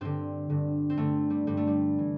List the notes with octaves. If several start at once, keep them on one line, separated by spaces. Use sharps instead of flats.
G2 D3 C4
G2 D3
C4
G2 D3 A3
G3
G2 D3 G3
A3
G3
E3